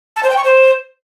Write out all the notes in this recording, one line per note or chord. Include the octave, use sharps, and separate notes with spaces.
A5
C5
G5
C#6
C5